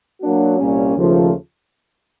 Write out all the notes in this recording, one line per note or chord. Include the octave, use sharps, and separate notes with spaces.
F#3 A#3 D4 F#4
C2 A#2 G3 A#3 C#4
D#2 C#3 F3 A3